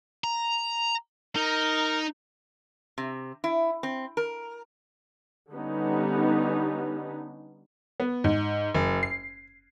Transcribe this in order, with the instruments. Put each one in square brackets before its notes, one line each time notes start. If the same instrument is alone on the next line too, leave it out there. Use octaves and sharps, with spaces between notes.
[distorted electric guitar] A#5
[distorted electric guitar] D#4 [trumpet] A#4
[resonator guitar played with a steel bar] C3
E4
C4
A#4
[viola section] D3 G3 B3 C#4 D#4
[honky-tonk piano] B3
G#2
F#1
C7